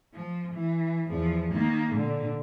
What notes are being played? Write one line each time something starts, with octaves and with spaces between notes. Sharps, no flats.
F3
E3
E2 F3
D#3 A#3
A#2 D3